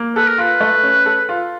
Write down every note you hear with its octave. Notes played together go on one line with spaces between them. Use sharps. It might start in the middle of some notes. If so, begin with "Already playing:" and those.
Already playing: A#3
A4 B4
A#4
F4 B4
A3
C#4
A4
F4